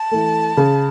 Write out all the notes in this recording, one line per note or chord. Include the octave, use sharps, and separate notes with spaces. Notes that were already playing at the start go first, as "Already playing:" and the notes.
Already playing: A5
E3 A3
C#3